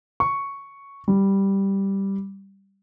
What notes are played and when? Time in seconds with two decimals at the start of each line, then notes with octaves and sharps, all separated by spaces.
0.20 C#6
1.08 G3